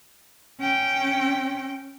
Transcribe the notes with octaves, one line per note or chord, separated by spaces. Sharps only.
C#4 G5